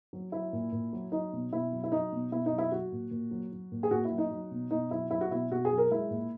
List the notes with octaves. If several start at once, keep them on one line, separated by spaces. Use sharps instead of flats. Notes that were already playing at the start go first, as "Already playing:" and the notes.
F#3
F#3 E4
A#2
A#2
F#3
F#3 D#4
B2
B2 E4
F#3
E4
F#3 D#4
B2
B2 E4
D#4
F#3
E4
F#3 F#4
A#2
A#2
F#3
F#3
A#2
G#4
A#2 F#4
E4
F#3
D#4
F#3
B2
B2 D#4
F#3 E4
F#3 E4
F#4
B2 E4
B2 F#4
G#4
F#3
A#4
G#3 E4
A#2